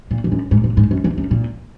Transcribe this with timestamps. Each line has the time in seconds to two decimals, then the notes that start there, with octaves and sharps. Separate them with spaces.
0.11 A#2
0.24 E2
0.32 F#2
0.51 G#2
0.64 A#2
0.77 G#2
0.91 F#2
1.04 E2
1.18 F#2
1.31 A#2